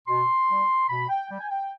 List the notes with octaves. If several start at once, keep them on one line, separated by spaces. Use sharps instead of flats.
B2 C6
G3
B2 B5
G5
G3 G5
G#5
G5